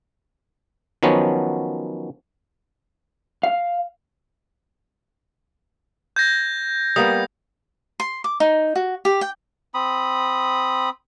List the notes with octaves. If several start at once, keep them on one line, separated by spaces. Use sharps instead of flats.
D#3 F3 F#3 B3 C#4
F5
G6 G#6 A#6
G3 A#3 B3 D#6
C6
D6
D#4
F#4
G4
G5
C4 B5 D#6